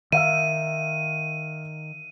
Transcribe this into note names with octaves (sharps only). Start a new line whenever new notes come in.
D#3 E5 F5 E6 D#7